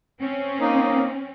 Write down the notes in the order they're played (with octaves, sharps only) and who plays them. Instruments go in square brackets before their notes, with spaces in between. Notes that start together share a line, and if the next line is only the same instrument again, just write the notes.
[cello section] C4 C#4
[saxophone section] A#3 D#4